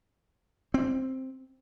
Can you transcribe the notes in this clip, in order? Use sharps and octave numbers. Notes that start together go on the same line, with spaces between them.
C4